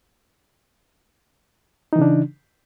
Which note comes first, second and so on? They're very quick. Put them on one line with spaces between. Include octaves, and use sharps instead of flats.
D#4 E3 C#3 D4